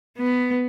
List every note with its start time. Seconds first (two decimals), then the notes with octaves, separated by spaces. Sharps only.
0.17 B3